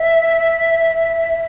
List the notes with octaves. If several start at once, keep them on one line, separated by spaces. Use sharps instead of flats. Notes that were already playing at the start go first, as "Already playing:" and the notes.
Already playing: E5